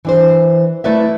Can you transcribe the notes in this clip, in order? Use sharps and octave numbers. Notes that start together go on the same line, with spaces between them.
E3 D4 C5
A3 E4 B4 D5 E5